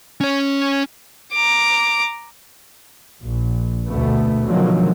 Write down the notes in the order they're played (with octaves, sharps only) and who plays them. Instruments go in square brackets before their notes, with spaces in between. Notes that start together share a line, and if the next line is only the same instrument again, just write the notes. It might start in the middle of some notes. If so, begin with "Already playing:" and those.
[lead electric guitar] C#4 C#5
[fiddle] A#5 D6
[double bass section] A#1
D2 B2 A3 B3
B2 D3 D#3 F3 F#3 G#3